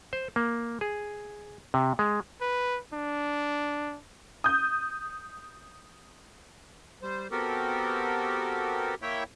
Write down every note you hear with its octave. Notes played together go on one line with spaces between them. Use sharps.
C5
A#3
G#4
C3
G#3
B4
D4
D#6 G6
G3 C5
B3 C4 F#4 G4 A4 A#4
A#3 E4 C#5 E5 G5